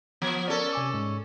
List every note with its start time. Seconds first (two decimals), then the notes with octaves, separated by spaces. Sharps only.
0.22 F3 B3
0.48 C#4 A4 A#4 D5
0.73 C3 G#5 D6
0.94 G#2 G#3